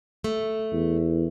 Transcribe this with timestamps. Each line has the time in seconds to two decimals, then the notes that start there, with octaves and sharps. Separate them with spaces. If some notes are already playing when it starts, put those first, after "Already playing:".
0.24 A3
0.72 E2